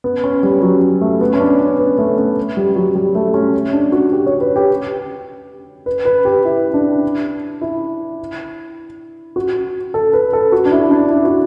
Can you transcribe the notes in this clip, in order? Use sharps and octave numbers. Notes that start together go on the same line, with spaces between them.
B3
C#4
G3
F#3
A3
B3
C#4
D4
C#4
B3
A3
B3
G3
F#3
G3
A3
C#4
D4
F#4
G4
C#5
B4
G4
B4
B4
G4
E4
D4
E4
F#4
A4
B4
A4
F#4
D4
E4
D4
E4
F#4